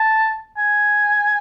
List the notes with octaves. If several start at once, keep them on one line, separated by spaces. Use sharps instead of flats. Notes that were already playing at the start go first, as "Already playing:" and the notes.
Already playing: A5
G#5